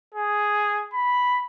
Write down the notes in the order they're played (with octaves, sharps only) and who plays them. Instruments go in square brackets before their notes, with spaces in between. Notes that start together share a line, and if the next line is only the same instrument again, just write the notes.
[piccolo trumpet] G#4
B5